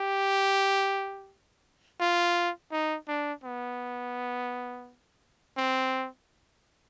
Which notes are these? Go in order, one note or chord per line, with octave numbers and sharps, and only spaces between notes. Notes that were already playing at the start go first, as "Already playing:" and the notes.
Already playing: G4
F4
D#4
D4
B3
C4